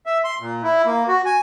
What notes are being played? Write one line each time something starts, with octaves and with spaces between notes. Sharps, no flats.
E5
C6
A#2
E4
A#3
F#4
G#5